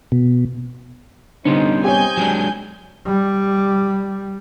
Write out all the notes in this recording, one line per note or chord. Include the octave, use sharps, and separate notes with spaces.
B2
D3 G3 B3 C#4 D#4 C5
C4 D#4 G4 C#5 G#5 G6
F#3 G#3 D4
G3